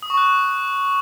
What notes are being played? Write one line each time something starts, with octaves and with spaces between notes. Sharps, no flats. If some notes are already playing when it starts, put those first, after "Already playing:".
D#6
C#6
F#6